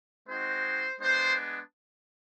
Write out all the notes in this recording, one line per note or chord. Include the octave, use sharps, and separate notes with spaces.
G#3 C4 D#4 F#4 C5
G#3 B3 D4 C5